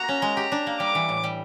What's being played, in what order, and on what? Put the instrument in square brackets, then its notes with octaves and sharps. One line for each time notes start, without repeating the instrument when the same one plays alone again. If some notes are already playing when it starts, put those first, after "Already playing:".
Already playing: [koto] A#3 F#4 [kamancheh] A#5
[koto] C#4
G#3
G4
D4
A#3
[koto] G3 [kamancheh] D6
[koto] E3
A2
G3